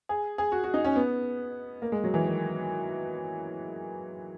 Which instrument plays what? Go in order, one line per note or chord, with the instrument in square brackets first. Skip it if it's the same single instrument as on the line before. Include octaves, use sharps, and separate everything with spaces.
[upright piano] G#4
G#4
F#4
F#4
D#4
C#4
B3
A#3
G#3
F#3
E3
D#3